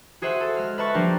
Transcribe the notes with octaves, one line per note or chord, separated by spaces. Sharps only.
F#4 G#4 C5 E5 F#5
A4
G#3 F6
B4 E5 A5 C#6
F3 G3 A#3 D4 G4 A#4